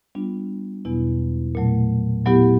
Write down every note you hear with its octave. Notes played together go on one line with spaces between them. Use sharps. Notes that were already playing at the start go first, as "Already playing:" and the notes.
G3 B3 D4 F4
E2 B2 F#3 B3 E4
A#2 F#3 A3
A#2 F#3 B3 E4 G4